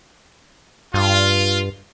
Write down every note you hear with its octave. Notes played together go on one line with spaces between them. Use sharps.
G2 F4